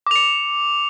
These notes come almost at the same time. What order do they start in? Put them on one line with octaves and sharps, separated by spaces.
D6 F7 C#7